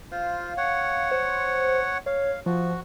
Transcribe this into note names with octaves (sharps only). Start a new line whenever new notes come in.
F4 C5 F5
C#5 F#5
C5
C#5 F5
F3 F#4